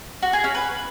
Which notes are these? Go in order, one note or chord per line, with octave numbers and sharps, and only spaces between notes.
F#4
G#4
C#4
B4